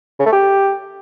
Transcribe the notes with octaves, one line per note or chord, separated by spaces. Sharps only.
C#3
A3
G4